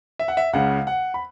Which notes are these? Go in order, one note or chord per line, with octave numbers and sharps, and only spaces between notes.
E5
F#5
E5
C#2 C#3 G#3 C#4 F#5
F#5
B5